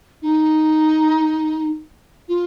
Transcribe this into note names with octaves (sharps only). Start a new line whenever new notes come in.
D#4
F4